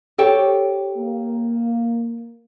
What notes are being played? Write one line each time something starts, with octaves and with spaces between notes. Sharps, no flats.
G4 A4 C#5 G5
A#3